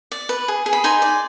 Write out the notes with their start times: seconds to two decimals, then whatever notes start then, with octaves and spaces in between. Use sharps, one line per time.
0.12 D5
0.29 B4
0.48 G#4
0.66 G#4
0.73 B5
0.84 D#4 G#5 C6
1.02 D5